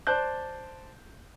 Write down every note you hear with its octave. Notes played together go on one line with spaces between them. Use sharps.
C5 D5 A5 F#6 G6